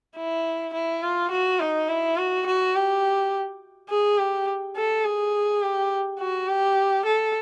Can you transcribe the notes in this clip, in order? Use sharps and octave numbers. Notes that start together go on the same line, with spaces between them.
E4
E4
F4
F#4
D#4
E4
F#4
F#4
G4
G#4
G4
A4
G#4
G4
F#4
G4
A4